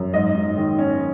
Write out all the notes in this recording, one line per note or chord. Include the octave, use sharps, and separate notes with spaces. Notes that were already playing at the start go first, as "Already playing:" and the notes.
Already playing: F#2
G#2 D#5
G#2
D#3
C#4